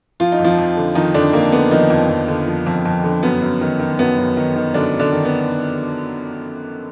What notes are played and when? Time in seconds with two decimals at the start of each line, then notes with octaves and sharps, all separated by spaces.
0.20 F3 F4
0.32 D#4
0.39 F2
0.44 F3 F4
0.58 F2
0.77 D3
0.95 D#3 F3 D#4
1.14 F2 D3 D4
1.33 F2 A#3
1.52 D3 B3
1.71 D#3 F3 D#4
1.90 F2
2.09 F2
2.28 D3
2.47 F3
2.66 F2
2.85 F2
3.04 D3
3.23 F#2 B3
3.42 F#2
3.61 D#3
3.79 D#3
3.99 F#2 B3
4.18 F#2
4.37 D#3
4.56 D#3
4.74 F#2 D3 D4
4.93 F#2
4.99 D3 D4
5.12 D#3
5.25 B3